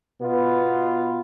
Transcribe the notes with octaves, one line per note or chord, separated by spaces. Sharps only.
B2 B3 F4 B4